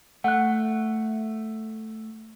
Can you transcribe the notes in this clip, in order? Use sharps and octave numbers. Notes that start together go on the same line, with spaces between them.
A3 F#5 F#6